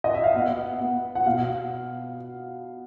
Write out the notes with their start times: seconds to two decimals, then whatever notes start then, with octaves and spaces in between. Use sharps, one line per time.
0.04 D#5
0.14 E5
0.24 F5
0.35 B3 F#5
0.80 B3
1.15 F#5
1.26 B2 F5